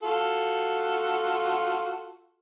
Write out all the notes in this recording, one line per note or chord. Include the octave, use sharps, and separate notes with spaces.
F4 F#4 A4